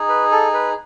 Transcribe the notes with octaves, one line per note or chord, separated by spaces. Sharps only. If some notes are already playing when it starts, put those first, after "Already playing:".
Already playing: D#4 G#4
B4
A4
B4